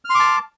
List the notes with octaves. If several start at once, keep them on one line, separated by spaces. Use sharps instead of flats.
A5 C6 D6 F6